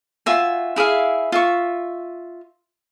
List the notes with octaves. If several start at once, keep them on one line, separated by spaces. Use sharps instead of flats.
F4 F#4 E5 G#5
E4 G#4 E5 F5
F4 E5 C#6